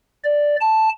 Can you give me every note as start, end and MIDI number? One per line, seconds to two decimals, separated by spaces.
0.24 0.56 74
0.60 0.89 81